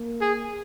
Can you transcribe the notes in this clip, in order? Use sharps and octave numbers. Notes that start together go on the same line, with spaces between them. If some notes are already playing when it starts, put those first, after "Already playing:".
Already playing: A#3
G#4